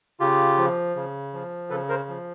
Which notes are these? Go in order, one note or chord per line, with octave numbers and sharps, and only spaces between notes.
C#3 F4 G4
F3
C#3
F3
C#3 A4 B4
A#4 C5
F3